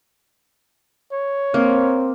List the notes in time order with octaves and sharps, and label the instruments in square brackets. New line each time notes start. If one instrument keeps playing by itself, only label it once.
[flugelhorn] C#5
[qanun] A#3 [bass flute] C4